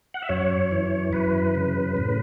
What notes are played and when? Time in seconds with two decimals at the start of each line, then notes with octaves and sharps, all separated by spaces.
0.14 F#5
0.22 E5
0.29 F#2 C#5
0.71 E3
1.13 F#2 B4
1.55 C#3
1.97 A2